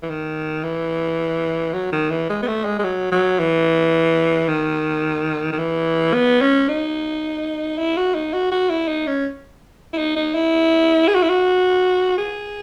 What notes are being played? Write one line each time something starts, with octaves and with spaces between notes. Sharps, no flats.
E3
D#3
E3
F#3
D#3
E3
G#3
B3
A3
G#3
G#3
F#3
F#3
E3
D#3
D#3
E3
B3
C#4
D#4
E4
F#4
D#4
F#4
F#4
E4
D#4
C#4
E4
D#4
D#4
E4
G#4
F#4
E4
F#4
G#4